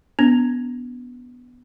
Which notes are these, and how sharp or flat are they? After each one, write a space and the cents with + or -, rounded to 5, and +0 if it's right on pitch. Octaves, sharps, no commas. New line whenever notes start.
B3 +0 D4 -30